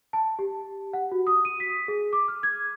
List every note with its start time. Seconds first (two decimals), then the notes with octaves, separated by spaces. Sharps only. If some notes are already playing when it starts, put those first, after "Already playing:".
0.13 A5
0.39 G4
0.93 F#5
1.12 F#4
1.27 D#6
1.45 D#7
1.60 B6
1.88 G#4
2.13 D6
2.28 F6
2.43 G#6